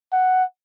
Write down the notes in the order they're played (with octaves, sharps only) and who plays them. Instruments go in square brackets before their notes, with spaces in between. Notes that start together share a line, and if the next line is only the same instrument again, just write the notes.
[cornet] F#5